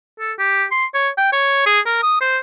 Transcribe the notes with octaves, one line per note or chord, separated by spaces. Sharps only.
A4
G4
C6
C#5
G5
C#5
G#4
A#4
D#6
C5